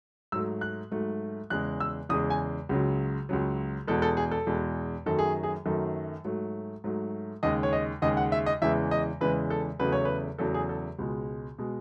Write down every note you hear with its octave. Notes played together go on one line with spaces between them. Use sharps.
G#2 F#3 A3 E6
F#6
G#2 F#3 A3
E2 C#3 G#3 F#6
E6
E2 C#3 G#3 D#6
G#5
C#2 C#3 F#3
C#2 C#3 F#3
E2 B2 G#3 A4
A4
G#4
A4
E2 B2 G#3
F#2 D#3 F#3 A3 A4
G#4
G#4
F#2 D#3 F#3 A3 A4
G#2 F#3 A3
G#2 F#3 A3
D#2 C#3 G#3 D#5
C#5
D#5
D#2 C#3 G#3 D#5
F#5
E5
D#5
E2 C#3 E3 G#3 E5
D#5
E2 C#3 E3 G#3 B4
A4
E2 C#3 F#3 A3 B4
C#5
B4
E2 C#3 F#3 A3 A4
G#4
A4
C#2 B2 G#3
B2 G#3